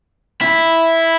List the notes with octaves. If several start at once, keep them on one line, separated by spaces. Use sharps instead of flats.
E4